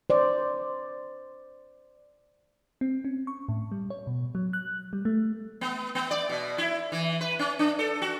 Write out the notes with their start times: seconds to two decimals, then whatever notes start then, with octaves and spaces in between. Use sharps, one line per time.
0.10 C5 D5
2.81 C4
3.05 C#4
3.27 C#6
3.49 A2
3.72 G3
3.90 C#5
4.07 B2
4.35 F#3
4.53 F#6
4.93 G3
5.05 A3
5.61 B3
5.95 B3
6.11 D5
6.30 B2
6.58 E4
6.92 E3
7.21 B4
7.39 C#4
7.59 D4
7.79 A4
8.02 F#4